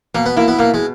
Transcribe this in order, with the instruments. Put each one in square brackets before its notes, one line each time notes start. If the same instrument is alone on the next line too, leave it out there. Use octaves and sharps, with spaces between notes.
[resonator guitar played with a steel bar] B2 [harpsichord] A#3
[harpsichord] B3
[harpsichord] A#3 [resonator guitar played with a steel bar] E4
[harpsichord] B3
[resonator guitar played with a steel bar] B2 [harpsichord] A#3
[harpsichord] G#3